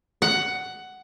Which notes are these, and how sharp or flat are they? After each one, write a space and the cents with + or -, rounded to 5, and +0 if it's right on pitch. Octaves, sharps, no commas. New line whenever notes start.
F#5 +10